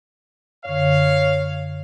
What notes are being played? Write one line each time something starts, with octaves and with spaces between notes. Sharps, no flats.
F#2 D3 C#5 F5